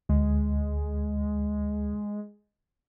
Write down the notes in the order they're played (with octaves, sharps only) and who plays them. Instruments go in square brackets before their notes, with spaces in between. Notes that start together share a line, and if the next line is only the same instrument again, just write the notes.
[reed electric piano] D2 [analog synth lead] G#3